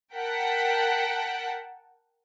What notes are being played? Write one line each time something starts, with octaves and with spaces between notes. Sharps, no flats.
A#4 F#5 G5 A5 B6